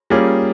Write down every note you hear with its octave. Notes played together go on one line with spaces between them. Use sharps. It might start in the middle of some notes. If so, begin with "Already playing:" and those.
G3 A#3 C#4 F4 G#4